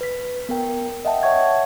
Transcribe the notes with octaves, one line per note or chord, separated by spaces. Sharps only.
B4 B6
B3 A#4 G5
D#5 E5 F#5 G5 A5
C#5 E5 F#5 C#6 G#6